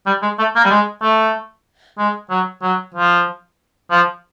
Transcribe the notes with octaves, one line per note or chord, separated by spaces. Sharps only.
G3
G#3
A3
A#3
G3
G#3
A3
G#3
F#3
F#3
F3
F3